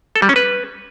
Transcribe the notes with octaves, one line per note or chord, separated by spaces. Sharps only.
A4
G3
C#4
B4